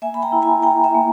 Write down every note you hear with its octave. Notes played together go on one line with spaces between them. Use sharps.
A#3 E5 G#5
B5
G5 A#5
E4
G#5 B5
E4 G5 A#5
E5 G#5
A#3